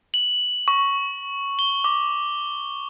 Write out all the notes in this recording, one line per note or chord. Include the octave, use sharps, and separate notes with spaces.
F#7
C#6
G7
D6